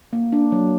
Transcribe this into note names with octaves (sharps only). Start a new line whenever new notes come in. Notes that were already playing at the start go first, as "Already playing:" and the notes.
A#3
D4
F#3